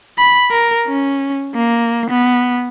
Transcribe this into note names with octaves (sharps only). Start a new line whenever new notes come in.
B5
A#4
C#4
A#3
B3